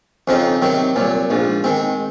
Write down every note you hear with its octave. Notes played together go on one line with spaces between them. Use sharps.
F2 C#3 F3 C4 D#4
C3 D#3 F#3 C4
C2 A#2 F#3
A#1 G#2 F3
D#3 G#3 C4